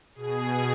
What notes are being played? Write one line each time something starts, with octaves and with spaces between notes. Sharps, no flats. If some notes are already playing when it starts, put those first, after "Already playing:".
B2 G#4